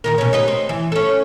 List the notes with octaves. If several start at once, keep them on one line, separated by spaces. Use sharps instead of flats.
A#2 D#3 A#4
B2 C#4
D#4 G4 B4
C4
E3
C#4 A4